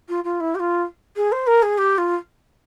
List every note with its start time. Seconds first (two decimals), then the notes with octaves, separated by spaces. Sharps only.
0.09 F4
0.24 F4
0.40 E4
0.55 G4
0.60 F4
1.16 G#4
1.32 C5
1.47 A#4
1.62 G#4
1.78 G4
1.98 F4